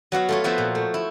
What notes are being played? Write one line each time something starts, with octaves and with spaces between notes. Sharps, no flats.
F#3 B3 F#4 F5
A3 F4 C#5
F3 B3 F#4 B4 C5 E5
A#2
A3
E4